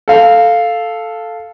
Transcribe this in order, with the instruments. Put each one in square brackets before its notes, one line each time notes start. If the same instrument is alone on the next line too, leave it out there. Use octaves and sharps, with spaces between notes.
[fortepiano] A4 F5